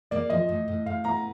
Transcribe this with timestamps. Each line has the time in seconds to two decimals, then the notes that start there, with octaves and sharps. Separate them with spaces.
0.11 A#3 D5
0.30 F3 D#5
0.49 A2
0.68 A2
0.86 A2 F5
1.04 B3 A#5